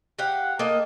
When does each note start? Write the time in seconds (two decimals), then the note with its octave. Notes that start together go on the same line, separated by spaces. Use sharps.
0.19 G4 F5 F#5
0.59 A#3 A4 D#5